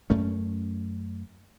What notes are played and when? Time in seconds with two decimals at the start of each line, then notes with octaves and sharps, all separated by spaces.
0.10 F#2 A3 C#4